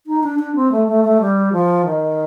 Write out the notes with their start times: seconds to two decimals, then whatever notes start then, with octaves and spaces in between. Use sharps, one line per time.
0.07 D#4
0.23 D4
0.39 D4
0.56 C4
0.72 A3
0.88 A3
1.04 A3
1.21 G3
1.53 F3
1.86 D#3